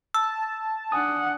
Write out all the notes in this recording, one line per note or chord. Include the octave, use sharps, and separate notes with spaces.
A5 E6
D4 F#5 G#5 D#6